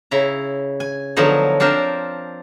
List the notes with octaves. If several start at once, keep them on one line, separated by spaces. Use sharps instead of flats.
C#3 E4 A#5
G#5
D3 F3 F#3 B3 D#4
C4 D4 F4 A#4 C5